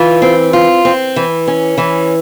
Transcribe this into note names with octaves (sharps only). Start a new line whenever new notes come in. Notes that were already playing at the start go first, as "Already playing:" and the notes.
Already playing: E3 F4
C4
F4
C4
E3
C#4
E3